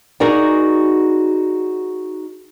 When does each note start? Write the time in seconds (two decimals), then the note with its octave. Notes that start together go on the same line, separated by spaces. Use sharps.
0.20 D#4 F#4 G#4 A#4 D5 G#5